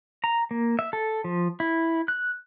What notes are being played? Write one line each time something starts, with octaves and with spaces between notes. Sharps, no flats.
A#5
A#3
E5
A4
F3
E4
F#6